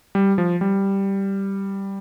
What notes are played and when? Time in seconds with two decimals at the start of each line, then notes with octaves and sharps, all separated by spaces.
0.15 G3
0.38 F3
0.61 G3